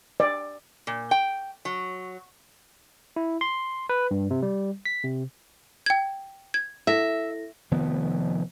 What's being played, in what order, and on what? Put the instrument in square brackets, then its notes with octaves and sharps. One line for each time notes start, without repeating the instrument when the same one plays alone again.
[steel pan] D5
[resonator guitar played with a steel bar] A#2
G5
F#3
[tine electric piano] E4
C6
B4
G2
C3
G3
B6
C3
[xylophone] G5 G#6
G#6
[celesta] E4 A4 A#6 [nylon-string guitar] E5
[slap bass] F1 D#3 F3 B3